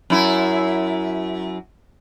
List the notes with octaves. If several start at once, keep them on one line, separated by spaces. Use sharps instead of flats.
F#2 E4